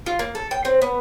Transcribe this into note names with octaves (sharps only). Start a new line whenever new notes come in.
F4
A#3
A4
G5
C4
B3